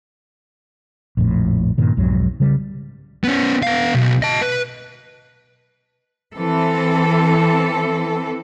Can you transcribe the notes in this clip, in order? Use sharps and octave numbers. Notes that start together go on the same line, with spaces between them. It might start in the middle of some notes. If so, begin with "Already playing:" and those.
A#1 F2 A2
G2 A#2 D#3
B1 F2 G#2 F#3
C#3 G3
B3 C#4
B3 F5
B1
D#5 A5
B4
E3 C4 A4